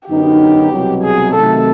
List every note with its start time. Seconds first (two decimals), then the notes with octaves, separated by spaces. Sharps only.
0.08 F#2 D3 F#3 B3 D#4 G4
0.72 C2 B2 F#3
1.04 G#4
1.34 C3 D#3 F#3 A3 A4